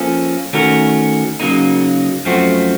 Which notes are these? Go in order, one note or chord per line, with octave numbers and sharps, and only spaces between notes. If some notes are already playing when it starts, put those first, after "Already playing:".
Already playing: F3 A#3 C#4 A4
D#3 A3 C#4 F#4 A#4
C#3 F#3 A#3 D#4
F#2 F3 A3 C4 F#4